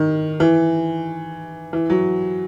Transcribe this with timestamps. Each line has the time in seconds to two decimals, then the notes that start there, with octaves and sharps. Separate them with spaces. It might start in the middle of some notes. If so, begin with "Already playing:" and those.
Already playing: D#3
0.40 E3
1.73 E3
1.90 F#3